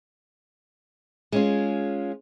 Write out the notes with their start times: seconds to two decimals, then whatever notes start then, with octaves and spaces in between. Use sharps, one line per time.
1.32 G#3 C#4 F4